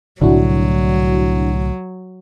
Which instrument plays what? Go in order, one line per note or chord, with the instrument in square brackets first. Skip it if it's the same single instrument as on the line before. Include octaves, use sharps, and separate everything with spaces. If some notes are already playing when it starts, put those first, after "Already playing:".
[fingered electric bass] C2 A2 D3 [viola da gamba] F#3 [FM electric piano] D4 E4 F#4